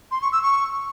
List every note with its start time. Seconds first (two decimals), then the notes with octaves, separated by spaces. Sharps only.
0.11 C6
0.22 C#6
0.32 E6
0.43 C#6